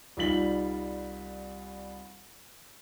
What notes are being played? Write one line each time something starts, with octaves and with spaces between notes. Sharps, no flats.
C2 G3 D#4 F4 B6 F#7